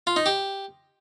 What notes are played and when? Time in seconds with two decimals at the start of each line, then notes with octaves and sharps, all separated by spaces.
0.07 F4
0.16 D#4
0.26 G4